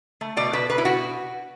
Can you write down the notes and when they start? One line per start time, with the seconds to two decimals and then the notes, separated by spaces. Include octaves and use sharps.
0.21 A3
0.37 B2 D5
0.53 B2 B4
0.69 B2 B4
0.78 E4
0.85 B2 F#4